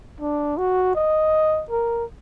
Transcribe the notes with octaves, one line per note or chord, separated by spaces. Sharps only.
D4
F#4
D#5
A#4